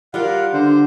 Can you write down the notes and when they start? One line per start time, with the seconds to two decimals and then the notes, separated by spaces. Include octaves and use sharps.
0.14 G3 F4 A#4 F5 F#5
0.53 D3 C5